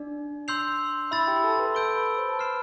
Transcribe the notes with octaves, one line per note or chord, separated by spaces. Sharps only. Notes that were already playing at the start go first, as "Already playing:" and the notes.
Already playing: D4 D5
C6 E6 G6 C7 F7
E4 E5 B5 E6 A6
G4 G5
A4 A5
C6
B4 B5
A4 A5 E6 G6 D7 G7
B4 B5
C5 C6
A5
B4 B5 F6 C7 E7